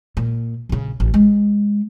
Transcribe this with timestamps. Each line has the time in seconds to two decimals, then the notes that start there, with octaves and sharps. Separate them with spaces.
0.17 A#2
0.69 A#1 C#3
1.00 A1
1.14 G#3